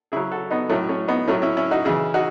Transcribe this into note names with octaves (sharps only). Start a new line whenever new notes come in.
C#3 F#3 E4 G#4
F#4 A4
B3 D#4
A2 F#3 A3 C#4
A3 C#4
B3 D#4
A2 F#3 A3 C#4
C#4 E4
C#4 E4
D#4 F#4
C#3 E3 E4 G#4
D#4 F#4